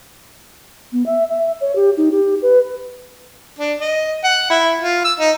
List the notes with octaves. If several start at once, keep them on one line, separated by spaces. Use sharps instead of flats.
B3
E5
E5
C#5
G4
D#4
G4
B4
D4
D#5
F#5
E4
F4
E6
D#4